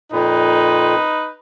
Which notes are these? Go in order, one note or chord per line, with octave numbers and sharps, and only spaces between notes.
F2 A#2 D#4 B4